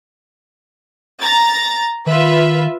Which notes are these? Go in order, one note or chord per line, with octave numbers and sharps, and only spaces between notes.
A#5 A6
D#3 F4 B4 E5